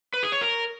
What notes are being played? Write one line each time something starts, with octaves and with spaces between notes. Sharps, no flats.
B4
G#4
C#5
A#4